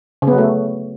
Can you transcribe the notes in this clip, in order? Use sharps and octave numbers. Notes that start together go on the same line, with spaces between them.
C#3
B3
F#3
A3